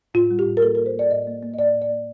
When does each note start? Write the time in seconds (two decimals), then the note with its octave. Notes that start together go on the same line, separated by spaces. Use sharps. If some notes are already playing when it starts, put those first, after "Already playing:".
0.14 A2 F4
0.31 G3
0.39 G4
0.46 A2
0.57 A#4
0.62 A#3 A4
0.75 A#3 A#4
0.86 C5
0.94 A#3 D5
1.11 A2 D#5
1.27 A#3
1.43 A#3
1.54 D#5
1.58 A2 D5
1.74 A2
1.82 D5
1.90 A#3